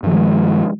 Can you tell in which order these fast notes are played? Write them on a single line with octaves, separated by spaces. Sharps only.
G2 F3 D#3 G#3